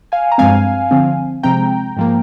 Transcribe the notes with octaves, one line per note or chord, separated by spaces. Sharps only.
F5 G#5
A#5
G2 F3 G#3 C4 F5 G#5
D3 F3 C4
C3 F3 G#3 C4 G5 A#5
G#2 F3 A#3